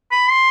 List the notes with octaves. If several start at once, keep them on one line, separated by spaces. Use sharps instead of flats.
B5
C6